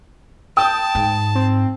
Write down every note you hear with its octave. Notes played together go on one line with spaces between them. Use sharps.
G5 A5 D#6
G#2
C4